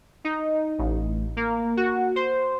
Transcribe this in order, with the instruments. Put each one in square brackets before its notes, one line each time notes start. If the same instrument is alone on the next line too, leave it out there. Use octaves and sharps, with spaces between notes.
[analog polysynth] D#4
A1
A#3
F#4
C5